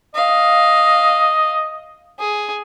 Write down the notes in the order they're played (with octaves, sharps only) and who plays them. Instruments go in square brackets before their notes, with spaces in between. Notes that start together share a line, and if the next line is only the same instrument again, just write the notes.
[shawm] D#5 [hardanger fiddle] F5
[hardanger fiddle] G#4